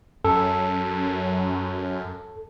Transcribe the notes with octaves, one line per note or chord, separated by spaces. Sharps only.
F#2 A4